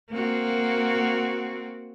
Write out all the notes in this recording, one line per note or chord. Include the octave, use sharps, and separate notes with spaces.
A#3 C4 F#4